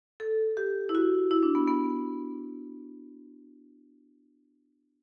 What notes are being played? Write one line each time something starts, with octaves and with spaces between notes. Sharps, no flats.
A4
G4
E4
F#4
E4
D4
B3
B3